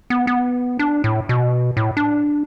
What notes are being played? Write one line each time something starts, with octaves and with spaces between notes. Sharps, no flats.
B3
B3
D4
A2
B2
A2
D4